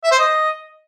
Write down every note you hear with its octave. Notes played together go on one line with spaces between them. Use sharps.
E5
C5
D#5